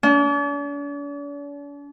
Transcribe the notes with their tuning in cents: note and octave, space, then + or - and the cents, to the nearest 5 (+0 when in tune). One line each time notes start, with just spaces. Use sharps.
D4 -45